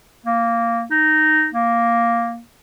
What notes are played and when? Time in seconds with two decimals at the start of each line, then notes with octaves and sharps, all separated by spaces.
0.26 A#3
0.90 D#4
1.54 A#3